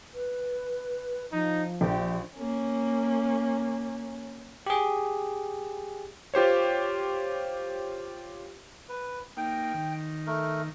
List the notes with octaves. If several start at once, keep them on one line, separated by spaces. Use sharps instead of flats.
B4
F3 D#4
A#1 G4
A#3 C#4
G4 G#4
F4 G4 C5 C#5
B4
A#3 D#4 G5
D#3
A3 A#4